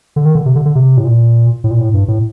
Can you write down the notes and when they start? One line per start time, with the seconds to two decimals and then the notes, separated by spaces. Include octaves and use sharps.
0.16 D3
0.25 D#3
0.35 D3
0.46 C3
0.55 D3
0.66 D3
0.75 C3
0.97 A2
1.05 A#2
1.64 A2
1.71 A#2
1.79 A2
1.94 G2
2.08 A2